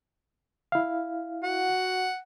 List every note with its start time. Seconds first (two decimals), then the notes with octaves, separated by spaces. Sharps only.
0.72 E4 F5
1.43 F#4 F#5